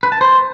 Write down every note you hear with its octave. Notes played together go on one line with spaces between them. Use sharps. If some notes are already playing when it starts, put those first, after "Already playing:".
B4
A5
C5